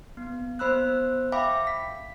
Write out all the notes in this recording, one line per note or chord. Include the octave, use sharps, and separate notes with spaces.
B3
B3 C5 B5 E6 F#6
E5 F5 G5 B5 D6
B6